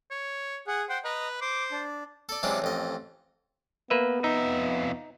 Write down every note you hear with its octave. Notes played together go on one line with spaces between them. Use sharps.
C#5
G#4 F#5
C5 F#5 G5
B4 D#5 A#5
C5 D6
D4
A4 D5
C3 E3 F#3 G#3 C#4 D4
A1 F2 D#5
A#3 B3 B4 E5
F2 D#4 E5